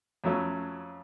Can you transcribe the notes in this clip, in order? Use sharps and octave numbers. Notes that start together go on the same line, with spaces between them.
F2 F#3 A3 C#4